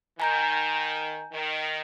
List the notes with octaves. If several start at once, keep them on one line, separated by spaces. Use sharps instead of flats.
D#3 G#5 A#5 G6
D#3